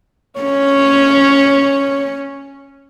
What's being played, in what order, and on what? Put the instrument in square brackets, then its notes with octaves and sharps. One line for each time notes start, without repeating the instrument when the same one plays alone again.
[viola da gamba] C#4 [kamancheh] C#5